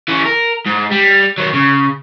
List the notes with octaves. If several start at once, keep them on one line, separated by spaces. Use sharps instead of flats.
E3 C#4
A#4
G#2
G3
D#3 F#3
C#3